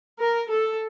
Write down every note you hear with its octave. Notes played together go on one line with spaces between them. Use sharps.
A#4
A4